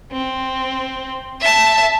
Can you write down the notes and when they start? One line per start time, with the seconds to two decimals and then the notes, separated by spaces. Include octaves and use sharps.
0.12 C4
1.41 E5 A5